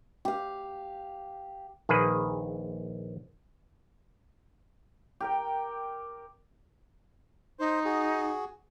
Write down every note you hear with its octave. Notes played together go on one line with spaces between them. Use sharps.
G4 F5
A#1 D#3 A#3 G#4 B4
G4 A#4 G5
D#4 C5
F#4 G#4